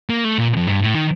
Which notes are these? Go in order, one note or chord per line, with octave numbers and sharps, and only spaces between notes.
A#3
A3
A#2
F2
G2
A2
D#3